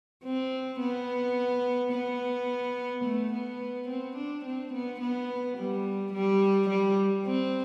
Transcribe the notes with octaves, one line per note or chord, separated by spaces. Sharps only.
C4
B3
B3
A3
B3
C4
D4
C4
B3
B3
G3
G3
G3
C4